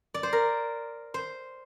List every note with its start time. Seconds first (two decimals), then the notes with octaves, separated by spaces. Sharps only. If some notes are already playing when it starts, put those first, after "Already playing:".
0.14 D5
0.23 C5
0.33 A#4
1.14 C5